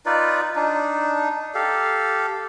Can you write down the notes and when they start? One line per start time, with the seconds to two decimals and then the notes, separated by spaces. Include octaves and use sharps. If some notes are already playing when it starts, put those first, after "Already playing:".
0.06 D#4 F4 B4 D5
0.56 D4 D#4
1.55 G4 A4 F5